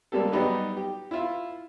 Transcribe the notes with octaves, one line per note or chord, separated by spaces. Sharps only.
G3 G#3 A#3 G4 A4
F#3 G3 B3 D#4 G4 B4
G4
E4 F4